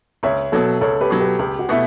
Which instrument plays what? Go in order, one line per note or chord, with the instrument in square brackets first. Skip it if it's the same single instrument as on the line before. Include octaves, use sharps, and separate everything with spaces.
[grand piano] C#2 [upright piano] C#5 E5
[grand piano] B2 F#3 [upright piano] A4 C#5
[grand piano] C#2 [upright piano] A4 C#5
[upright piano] G4 B4
[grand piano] B2 F#3
[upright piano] G4 B4
[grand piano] C#2 [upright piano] G4
[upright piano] F#4
[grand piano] B2 A3 E4